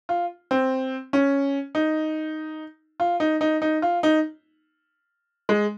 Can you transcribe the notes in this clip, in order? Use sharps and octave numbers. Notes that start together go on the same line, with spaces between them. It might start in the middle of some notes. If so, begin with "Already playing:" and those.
F4
C4
C#4
D#4
F4
D#4
D#4
D#4
F4
D#4
G#3